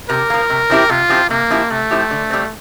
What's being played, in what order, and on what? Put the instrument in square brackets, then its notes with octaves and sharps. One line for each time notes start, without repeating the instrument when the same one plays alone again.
[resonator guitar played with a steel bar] C3 [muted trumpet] A#4
[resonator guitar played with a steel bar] F3 A#3
C3
F3 C4 E4 G4
[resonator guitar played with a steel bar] C3 [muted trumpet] F4
[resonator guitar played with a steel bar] F3 C4 E4 G4
[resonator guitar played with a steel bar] C3 [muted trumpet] A#3
[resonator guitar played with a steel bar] F3 C4 E4 G4
[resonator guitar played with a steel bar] C3 [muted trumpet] A3
[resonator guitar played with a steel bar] F3 C4 E4 G4
D3
G3 C4